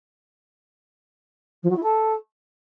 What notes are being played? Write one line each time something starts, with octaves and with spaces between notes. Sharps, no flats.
F3
F#3
E4
A4